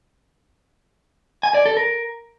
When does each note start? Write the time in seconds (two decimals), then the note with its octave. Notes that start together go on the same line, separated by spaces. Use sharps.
1.43 G#5
1.54 D5
1.66 A4
1.77 A#4